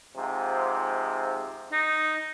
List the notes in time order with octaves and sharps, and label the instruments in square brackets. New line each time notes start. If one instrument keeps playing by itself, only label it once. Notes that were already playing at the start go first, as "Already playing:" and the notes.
[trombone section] G#2 C3 F3
[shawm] D#4